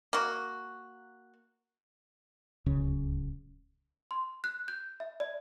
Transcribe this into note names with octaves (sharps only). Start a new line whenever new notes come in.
A#3 F#4
D1 C#2 C#3
C6
F#6
G6
E5
D5